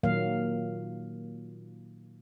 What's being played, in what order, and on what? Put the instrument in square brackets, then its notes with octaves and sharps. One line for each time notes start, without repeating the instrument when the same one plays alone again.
[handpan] A#2 D#3 F#3 A#3 F5